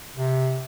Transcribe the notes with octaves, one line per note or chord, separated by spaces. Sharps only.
C3